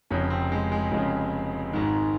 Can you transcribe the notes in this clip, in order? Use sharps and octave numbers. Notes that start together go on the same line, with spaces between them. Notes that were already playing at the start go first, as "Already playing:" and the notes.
F1 F2 C#3 C#4
C4
G#3
G#3
F1 F2 C#3 G#3
G#1 G#2 D#3 G#3